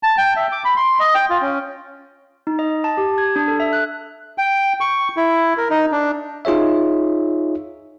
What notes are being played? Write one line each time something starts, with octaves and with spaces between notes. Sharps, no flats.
A5
G5
E5
D6
B5
C6
D#5
G5
F4
C#4
D#4
D#5
A5
G4
G#6
D4
A4
E5
F#6
G5
C#6
E4
A#4
D#4
D4
D#4 F4 G#4 C#5 E5